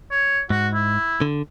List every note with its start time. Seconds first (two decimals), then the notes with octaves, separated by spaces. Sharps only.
0.11 C#5
0.50 G#2 F#4
0.74 E4
1.22 D3